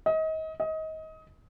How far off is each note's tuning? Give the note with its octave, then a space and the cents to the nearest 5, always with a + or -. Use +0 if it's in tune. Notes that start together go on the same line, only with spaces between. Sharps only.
D#5 +30
D#5 +25